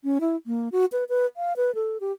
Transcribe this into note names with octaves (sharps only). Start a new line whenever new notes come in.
C#4
E4
A#3
F#4
B4
B4
F5
B4
A4
G4